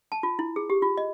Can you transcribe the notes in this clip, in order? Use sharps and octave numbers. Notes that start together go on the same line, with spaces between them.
A5
F4
E4
G#4
G4
F4
D#5